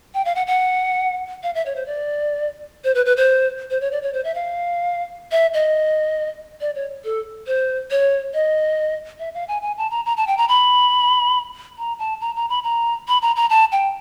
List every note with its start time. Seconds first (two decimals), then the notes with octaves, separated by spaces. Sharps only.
0.14 G5
0.25 F5
0.35 F#5
0.47 F#5
1.43 F5
1.55 E5
1.66 C#5
1.76 C5
1.86 D5
2.84 C5
2.95 B4
3.06 B4
3.17 C5
3.70 C5
3.81 C#5
3.92 D5
4.03 C#5
4.13 C5
4.24 E5
4.35 F5
5.32 E5
5.54 D#5
6.61 D5
6.75 C#5
7.04 A4
7.47 C5
7.91 C#5
8.34 D#5
9.19 E5
9.34 F5
9.48 G#5
9.62 G#5
9.78 A5
9.91 A#5
10.06 A#5
10.17 A5
10.27 G5
10.38 A#5
10.49 B5
11.78 A#5
11.99 A5
12.21 A#5
12.36 A#5
12.49 B5
12.64 A#5
13.08 B5
13.22 A#5
13.36 A#5
13.50 A5
13.72 G5